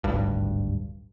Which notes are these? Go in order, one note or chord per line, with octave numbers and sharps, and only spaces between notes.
D1 G#1 G2